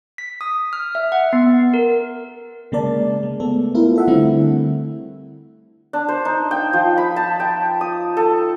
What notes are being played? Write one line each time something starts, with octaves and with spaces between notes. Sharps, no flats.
B6
D#6
F6
E5
F#5
B3
A#4
C#3 G#3 A#3 A#4 D5 A5
G#3
A3 B3 A4
B3 E4 F4 A#4
A4 E5 F#5
D3 G3 A3 C4 E4
D4
C5
D#4
G5
F3
B5
A5
G5
D#6
A4